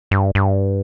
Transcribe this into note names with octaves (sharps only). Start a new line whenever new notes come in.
G2
G2